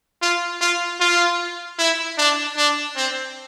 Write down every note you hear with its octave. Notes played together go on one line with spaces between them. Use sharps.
F4
F4
F4
E4
D4
D4
C4